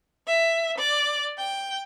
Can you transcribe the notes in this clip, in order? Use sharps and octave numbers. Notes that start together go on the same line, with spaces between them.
E5
D5
G5